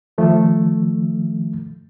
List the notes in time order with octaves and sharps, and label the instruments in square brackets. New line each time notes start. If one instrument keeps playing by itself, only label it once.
[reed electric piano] D#3 F3 A3